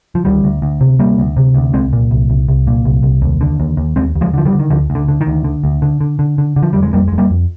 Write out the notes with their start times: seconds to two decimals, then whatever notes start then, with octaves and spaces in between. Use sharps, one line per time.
0.15 F3
0.25 D2 D#3 G3
0.44 D2
0.62 D2
0.81 C3
0.99 D2 G3 A#3
1.19 D2
1.37 C3
1.54 D2
1.73 C2 G#3 C4
1.93 A#2
2.11 C2
2.30 C2
2.48 C2
2.67 A#2
2.85 C2
3.03 C2
3.22 D#2
3.41 D3
3.60 D#2
3.77 D#2
3.96 D#2 G#3 C4
4.16 D#2
4.21 F3 G#3
4.34 D3 F3
4.45 D#3 G3
4.53 D3
4.59 D#3
4.70 D2 D3 F3
4.90 D2
4.95 D3
5.08 D3
5.21 D#3
5.27 D2
5.44 D3
5.64 D2
5.82 D3
6.01 D3
6.19 D3
6.38 D3
6.56 D3
6.62 F3
6.73 F2 G3
6.82 G#3
6.93 F2 G3 A#3
7.08 F2 G#3
7.18 G3 A#3
7.30 F2